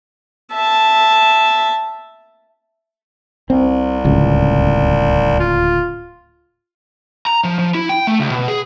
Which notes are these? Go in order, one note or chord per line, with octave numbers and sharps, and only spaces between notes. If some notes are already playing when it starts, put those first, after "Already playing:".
E5 A5
C2 C4
D1 C#2
F4
A#5
F3
F3
E4
G5
A3
C#2
B2
G#4